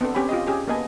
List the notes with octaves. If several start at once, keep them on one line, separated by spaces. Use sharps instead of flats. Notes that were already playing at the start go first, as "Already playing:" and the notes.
B3 C4 D4 A4
C4 C#4 G4 C#5 G#5 B5
F4 G4 D#5
C#4 G4 G#4
A#3 B3 B4 D#5 G#5 A5